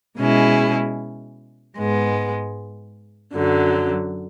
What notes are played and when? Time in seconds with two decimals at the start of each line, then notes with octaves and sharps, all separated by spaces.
0.18 B2 G#3 C#4 E4 G#4
1.76 G#2 G#3 B3
3.34 F#2 D3 F#3